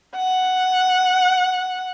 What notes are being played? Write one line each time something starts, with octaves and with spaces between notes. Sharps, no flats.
F#5